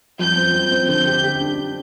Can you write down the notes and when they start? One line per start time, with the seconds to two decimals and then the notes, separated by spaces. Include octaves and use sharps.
0.19 F2 G6
0.37 C4
0.54 F2
0.71 C4
0.88 D3 G6
1.07 G4
1.23 G4
1.41 D4